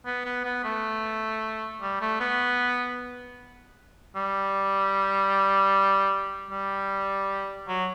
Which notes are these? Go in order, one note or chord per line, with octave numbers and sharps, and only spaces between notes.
B3
B3
B3
A3
G3
A3
B3
G3
G3
F#3